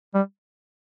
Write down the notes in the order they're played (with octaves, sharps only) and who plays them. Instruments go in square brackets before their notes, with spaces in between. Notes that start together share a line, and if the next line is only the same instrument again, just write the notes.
[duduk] G3